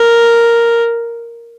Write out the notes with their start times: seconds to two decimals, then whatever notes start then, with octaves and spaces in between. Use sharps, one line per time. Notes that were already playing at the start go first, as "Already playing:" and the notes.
Already playing: A#4